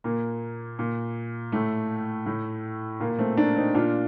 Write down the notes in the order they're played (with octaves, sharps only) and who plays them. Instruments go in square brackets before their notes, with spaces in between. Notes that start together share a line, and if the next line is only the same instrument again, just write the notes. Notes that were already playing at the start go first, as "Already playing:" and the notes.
[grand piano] A#2 A#3
A#2
A2 A3
A2
A#2 A#3
A#3
A3 C4
A#3 D4
C4 D#4
A#2 D4 F4